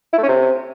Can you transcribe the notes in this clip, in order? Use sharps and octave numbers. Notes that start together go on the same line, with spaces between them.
E4
A3
C#4
C3